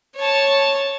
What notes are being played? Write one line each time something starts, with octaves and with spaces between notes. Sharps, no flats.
C#5 A5